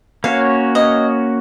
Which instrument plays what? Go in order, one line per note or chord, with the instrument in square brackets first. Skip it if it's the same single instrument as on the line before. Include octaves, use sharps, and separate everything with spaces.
[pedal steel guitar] A#3 C#4 F#4 C#5 [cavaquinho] F5
[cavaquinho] D#5